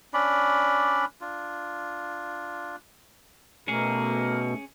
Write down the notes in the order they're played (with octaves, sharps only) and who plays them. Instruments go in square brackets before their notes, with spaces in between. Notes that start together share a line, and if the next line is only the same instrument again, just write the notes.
[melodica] C#4 D4 D5 B5
D4 F4
[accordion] B2 [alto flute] A3 [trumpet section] A#3 A#4 [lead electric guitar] C#4 G#4